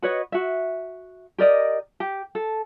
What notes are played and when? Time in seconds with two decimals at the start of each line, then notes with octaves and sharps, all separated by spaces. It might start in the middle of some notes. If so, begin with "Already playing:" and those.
0.02 F#4 B4 C#5 D#5
0.32 F#4 E5
1.38 G4 A#4 D5 D#5
2.00 G4
2.35 A4